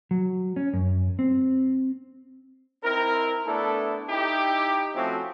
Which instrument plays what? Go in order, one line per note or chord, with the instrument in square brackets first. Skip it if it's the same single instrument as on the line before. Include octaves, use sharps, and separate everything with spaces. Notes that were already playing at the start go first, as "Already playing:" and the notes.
[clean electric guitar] F#3
C#4
F#2
C4
[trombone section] C4 D#4 E4 A#4
A3 B3 D4 E4 A4
D#4 E4 G4
F3 A3 C4 C#4 E4 F#4